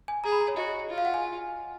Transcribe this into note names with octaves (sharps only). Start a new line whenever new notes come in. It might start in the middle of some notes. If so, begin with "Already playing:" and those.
G#5
G#4 A#5
B5
A#5
C#5
F#4 D#5
F4
F5
F#5
G#5